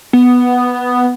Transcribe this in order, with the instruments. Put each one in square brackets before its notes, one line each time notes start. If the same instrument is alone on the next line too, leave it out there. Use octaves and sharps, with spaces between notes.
[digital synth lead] B3